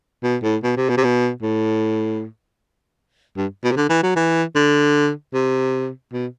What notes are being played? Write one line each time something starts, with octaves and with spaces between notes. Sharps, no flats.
B2
A2
B2
C3
B2
C3
B2
A2
G2
B2
C3
D3
E3
F#3
E3
D3
C3
B2